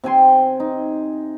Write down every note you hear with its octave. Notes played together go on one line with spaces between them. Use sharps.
C3 G5 G#5 C6
D#4